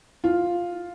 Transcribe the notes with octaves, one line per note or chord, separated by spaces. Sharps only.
F4